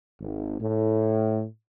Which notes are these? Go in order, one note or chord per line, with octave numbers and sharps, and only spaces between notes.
G#1
A2